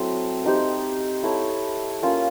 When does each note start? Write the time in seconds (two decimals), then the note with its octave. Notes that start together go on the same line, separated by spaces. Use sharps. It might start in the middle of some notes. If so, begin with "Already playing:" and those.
Already playing: F#3 A3 C4 E4
0.44 C4 D#4 G4 C5
1.23 E4 A4 C#5
2.02 A#3 C#4 F4